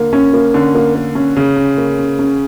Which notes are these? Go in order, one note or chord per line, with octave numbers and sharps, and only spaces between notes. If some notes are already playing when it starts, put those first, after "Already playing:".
Already playing: D3 A#3
C#4
A#3
D3 C#4
A#3
A#3
C#4
C#3 C#4
C#4
A#3
C#4
C#4